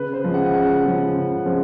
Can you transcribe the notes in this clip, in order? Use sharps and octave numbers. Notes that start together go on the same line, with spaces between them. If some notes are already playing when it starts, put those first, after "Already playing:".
Already playing: C#3 B4
C5
F3 G#3 C#4
F#5
C#3 F#5
F3 G#3 C#4
C#3
F3 G#3 C#4